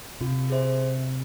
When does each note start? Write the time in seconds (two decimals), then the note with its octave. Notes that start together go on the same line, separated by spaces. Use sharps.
0.21 C3 F4
0.50 G#4 C5 E5